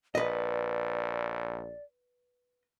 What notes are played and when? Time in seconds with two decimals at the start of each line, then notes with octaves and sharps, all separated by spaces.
0.15 A#1 B4 D5 D#5